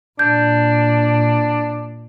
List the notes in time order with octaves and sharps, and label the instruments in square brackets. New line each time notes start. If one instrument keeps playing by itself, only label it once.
[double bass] A#2 [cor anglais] D4 [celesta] G6